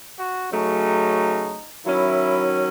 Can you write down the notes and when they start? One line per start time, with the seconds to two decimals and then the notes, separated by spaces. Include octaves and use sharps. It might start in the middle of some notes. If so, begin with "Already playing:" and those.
0.18 F#4
0.51 C#3 F#3 A3 C#4 D#4
1.85 D#3 F#3 C#4 E4